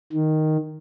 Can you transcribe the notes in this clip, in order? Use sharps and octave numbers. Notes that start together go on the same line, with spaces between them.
D#3